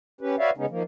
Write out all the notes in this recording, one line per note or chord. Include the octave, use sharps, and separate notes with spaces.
C#4 G4 B4
F#4 B4 C#5 D5 E5 F5
C#3 G#3 B3 C#4 D#4
D#3 F3 A#3